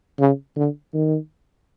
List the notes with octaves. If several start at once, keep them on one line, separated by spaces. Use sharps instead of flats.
C#3
D3
D#3